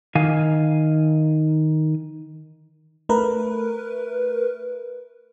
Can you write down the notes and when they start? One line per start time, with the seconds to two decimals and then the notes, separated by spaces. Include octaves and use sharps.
0.15 D#3 F5 G#5
3.09 A3 A#4 B4